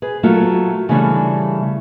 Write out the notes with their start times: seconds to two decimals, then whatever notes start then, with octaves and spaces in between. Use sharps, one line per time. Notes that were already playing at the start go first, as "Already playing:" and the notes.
0.02 G#4 B4
0.23 F#3 A3 A#3 F4
0.89 C#3 E3 G3 A3 C#4 D4